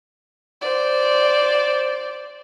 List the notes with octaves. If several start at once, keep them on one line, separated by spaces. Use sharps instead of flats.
C5 D5